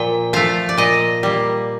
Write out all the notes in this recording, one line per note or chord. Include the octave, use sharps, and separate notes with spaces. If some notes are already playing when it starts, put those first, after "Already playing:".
Already playing: A#2 F3 G5
F3 A3 F5
D5
A#2 D#5
G3 A#3